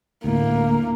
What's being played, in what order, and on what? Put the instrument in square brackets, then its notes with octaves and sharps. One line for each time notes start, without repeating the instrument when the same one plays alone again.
[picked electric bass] D2 A2 [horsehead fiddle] A#3